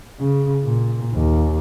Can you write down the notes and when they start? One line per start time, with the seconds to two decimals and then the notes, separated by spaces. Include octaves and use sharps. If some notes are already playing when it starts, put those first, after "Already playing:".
0.19 C#3
0.63 A#2
1.13 D#2